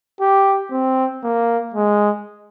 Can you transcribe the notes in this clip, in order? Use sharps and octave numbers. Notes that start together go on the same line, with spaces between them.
G4
C4
A#3
G#3